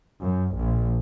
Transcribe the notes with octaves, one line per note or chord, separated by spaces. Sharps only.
F#2
A#1